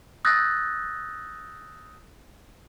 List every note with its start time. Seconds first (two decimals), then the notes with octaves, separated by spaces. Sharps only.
0.25 D#6 E6 F#6 G6 A6 A#6